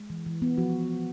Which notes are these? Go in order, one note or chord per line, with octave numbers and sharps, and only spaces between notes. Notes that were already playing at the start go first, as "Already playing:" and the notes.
Already playing: G#3
E3
E3
B3
F3 F#4